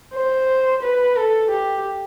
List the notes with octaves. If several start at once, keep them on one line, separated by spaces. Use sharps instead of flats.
C5
B4
A4
G4